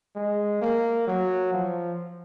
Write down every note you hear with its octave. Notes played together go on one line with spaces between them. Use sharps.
G#3
A#3
F#3
F3